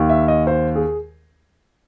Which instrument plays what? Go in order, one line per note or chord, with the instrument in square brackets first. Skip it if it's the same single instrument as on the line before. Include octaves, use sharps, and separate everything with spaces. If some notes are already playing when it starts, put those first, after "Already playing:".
Already playing: [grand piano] D#2 D#3
E5
D#5
C5
G#4